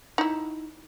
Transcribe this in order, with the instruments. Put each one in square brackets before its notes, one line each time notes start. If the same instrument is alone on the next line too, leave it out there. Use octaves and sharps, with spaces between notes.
[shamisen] D#4 E4